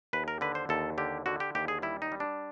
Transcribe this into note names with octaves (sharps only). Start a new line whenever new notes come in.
D#2 B4
A#4
D3 B4
C5
D#2 A4
D3 G4
D3 F#4
G4
D#2 G4
G#4
G3 E4
D#4
G3
D4